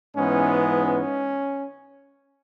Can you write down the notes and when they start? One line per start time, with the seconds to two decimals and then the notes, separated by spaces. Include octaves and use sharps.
0.16 G#2 E3 G#3 B3 C#4
0.79 C#4